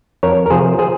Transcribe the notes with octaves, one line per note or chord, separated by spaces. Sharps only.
F2 A#4 C#5
A#4
C3 F3 G#4 C5
G#4 C5